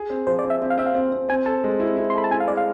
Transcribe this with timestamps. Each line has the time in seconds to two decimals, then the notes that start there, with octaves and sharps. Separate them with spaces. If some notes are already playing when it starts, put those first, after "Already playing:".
Already playing: G#4
0.10 C4
0.27 F3 C5
0.39 D5
0.44 C4
0.50 E5
0.62 C4
0.70 F5
0.78 C4 E5
0.86 F5
0.95 C4
1.12 C4
1.29 C4 G#5
1.46 A4 A5
1.64 G#3
1.80 E4
1.97 E4
2.10 C6
2.15 A4 B5
2.24 A5
2.31 E4 G#5
2.40 F5
2.48 G#3 D5
2.57 F5